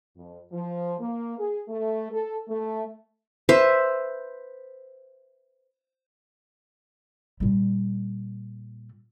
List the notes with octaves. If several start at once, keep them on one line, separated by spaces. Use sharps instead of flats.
F2
F3
A#3
G#4
A3
A4
A3
B4 C5 E5
A#2 G3